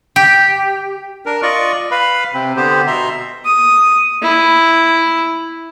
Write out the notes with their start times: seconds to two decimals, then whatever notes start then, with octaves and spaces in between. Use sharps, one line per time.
0.16 G4
1.26 D4 A#4
1.43 F4 D5 D#5 C#6
1.91 B4 F5 B5
2.34 C3 C4
2.56 D3 B3 G4 C5
2.87 B2 E5 A#5 C6
3.45 D#6
4.22 E4